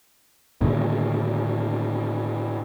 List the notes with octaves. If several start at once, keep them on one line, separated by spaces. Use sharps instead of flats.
A2 D3 D#3 A#3